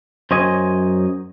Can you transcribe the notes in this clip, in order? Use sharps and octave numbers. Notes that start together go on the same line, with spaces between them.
F#2 C5 C#5 D#5 G#5